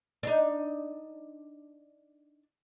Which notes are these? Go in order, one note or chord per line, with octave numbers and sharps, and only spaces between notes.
D4 D#4